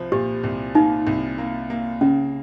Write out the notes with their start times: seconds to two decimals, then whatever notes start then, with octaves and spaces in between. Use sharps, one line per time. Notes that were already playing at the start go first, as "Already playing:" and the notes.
Already playing: C2 F3
0.12 A#2 G4
0.44 C2
0.75 A#3 D#4
1.07 C2
1.38 A#3
1.70 A#3
2.01 C#3 C#4